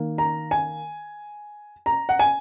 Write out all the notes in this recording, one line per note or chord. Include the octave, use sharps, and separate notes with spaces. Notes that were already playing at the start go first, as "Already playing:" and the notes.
Already playing: D#3 A#3
A#5
G#5
A#5
F#5
G#5